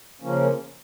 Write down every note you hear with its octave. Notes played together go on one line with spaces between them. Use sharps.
C#3 F3 A#3 C#4